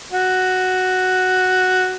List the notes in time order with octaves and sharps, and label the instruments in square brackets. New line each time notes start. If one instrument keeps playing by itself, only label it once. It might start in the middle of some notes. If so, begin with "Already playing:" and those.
[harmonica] F#4